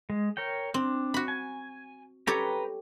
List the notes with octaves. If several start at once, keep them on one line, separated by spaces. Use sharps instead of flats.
G#3
A#4 C#5 G5
C4 D4
F#4 B5
G#5
G4 A4 B4 C#5 G5 A#5